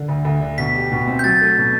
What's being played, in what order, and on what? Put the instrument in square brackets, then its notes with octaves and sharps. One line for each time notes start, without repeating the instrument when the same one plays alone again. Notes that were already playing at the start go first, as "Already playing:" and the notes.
Already playing: [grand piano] D3
D2
D2
D3
[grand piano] B2 [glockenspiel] B6
[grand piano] G4
B2
C4
[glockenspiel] G6
[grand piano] F#3 [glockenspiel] A6
[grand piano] A3
B2